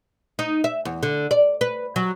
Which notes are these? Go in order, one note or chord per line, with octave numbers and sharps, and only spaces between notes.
D#4
E5
E2
D3
D5
B4
F#3